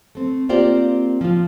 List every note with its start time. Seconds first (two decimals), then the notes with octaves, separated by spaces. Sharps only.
0.15 A3 C4
0.49 A#3 C4 F4 G4 C5 D5
1.21 F3 F4